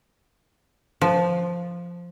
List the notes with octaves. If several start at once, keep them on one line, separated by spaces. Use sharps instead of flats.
F3